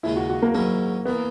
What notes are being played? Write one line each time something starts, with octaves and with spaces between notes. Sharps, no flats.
D#2 C#3 G#3 D#4 E4
F#4
F#4
A#3
G#2 D#3 F#3 A#3 C#4 E4
E3 A#3 B3